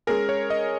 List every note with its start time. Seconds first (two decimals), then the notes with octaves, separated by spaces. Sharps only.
0.07 G#3 C#4 G#4 A#4
0.29 C#5
0.50 D#5